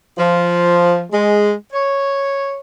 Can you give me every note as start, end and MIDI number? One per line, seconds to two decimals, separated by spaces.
0.16 1.01 53
1.11 1.50 56
1.71 2.59 73